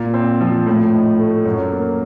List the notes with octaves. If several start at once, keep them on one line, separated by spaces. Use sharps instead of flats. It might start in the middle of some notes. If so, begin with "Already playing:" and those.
Already playing: A#2
C4
F3
A2
D#4
A3
F#2
A#3